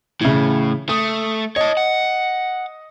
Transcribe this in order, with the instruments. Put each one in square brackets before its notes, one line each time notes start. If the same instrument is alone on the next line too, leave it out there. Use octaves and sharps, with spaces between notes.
[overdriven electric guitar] A2 [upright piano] C#3 E3
[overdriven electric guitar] A3 [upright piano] D#6
[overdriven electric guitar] C#5 A5 [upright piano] D#5
[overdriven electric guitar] F#5